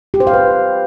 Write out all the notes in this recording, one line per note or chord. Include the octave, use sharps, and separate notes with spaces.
G4
C5
F5
B4